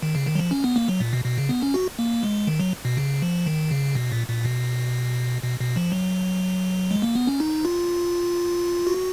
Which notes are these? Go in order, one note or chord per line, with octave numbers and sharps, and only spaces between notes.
D#3
C#3
D#3
F#3
F3
C#4
B3
A#3
F#3
A#2
B2
B2
C#3
B3
C#4
F#4
A#3
G#3
D#3
F#3
B2
C#3
F3
D#3
C#3
B2
A#2
A#2
B2
B2
B2
F3
F#3
G#3
A#3
B3
C#4
D#4
F4
F#4